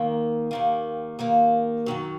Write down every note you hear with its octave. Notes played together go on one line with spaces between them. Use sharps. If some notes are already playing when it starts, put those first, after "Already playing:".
Already playing: D#2 D#3 A#3
D#2 D#3 A#3
D#2 D#3 A#3
F#2 D#3 F#3